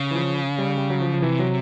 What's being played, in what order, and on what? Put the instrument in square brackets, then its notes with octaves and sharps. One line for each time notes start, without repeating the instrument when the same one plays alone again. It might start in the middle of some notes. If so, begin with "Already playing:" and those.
Already playing: [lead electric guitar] C#3
[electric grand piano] E3
F3
G3
G3
F#3
F3
F3
[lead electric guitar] C3 [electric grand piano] E3
[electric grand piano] F#3